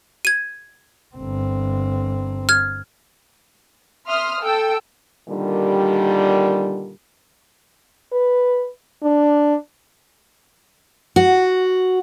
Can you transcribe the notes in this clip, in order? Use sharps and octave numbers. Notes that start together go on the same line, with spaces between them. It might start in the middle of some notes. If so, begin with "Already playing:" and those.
G#6 D#7
G1 C4
F6 G#6
E5 C6 D#6 F6
A4 G5 E6
A#2 D3 D#3 G3
B4
D4
F#4